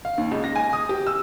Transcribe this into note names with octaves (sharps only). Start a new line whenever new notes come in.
F5
D#2
C#2
A#6
G#5
D#6
G4
E6